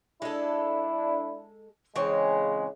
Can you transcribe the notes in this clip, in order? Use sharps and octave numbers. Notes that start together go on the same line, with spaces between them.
G#3 D4 E4 A4
C#3 E3 G#3 C4 C#5